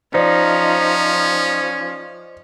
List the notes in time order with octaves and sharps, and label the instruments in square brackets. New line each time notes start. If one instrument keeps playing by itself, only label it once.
[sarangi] F3 [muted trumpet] C#4 [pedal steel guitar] D#4 [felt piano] C5 D5 D#5